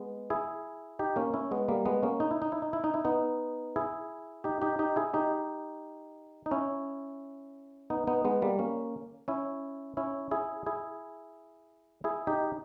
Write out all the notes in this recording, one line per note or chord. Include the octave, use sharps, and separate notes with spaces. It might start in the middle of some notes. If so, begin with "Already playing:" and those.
Already playing: G#3 B3
E4 G#4
D#4 G4
A#3 C#4
C#4 E4
G#3 B3
G3 A#3
G#3 B3
A#3 C#4
D#4
E4
D#4
E4
D#4
E4
D#4
E4
B3 D#4
E4 G#4
D#4 G4
D#4 G4
D#4 G4
E4 G#4
D#4 G4
D#4
C#4 E4
B3 D#4
B3 D#4
G#3 B3
G3 A#3
A#3 C#4
C#4 E4
C#4 E4
E4 G#4
E4 G#4
E4 G#4
D#4 G4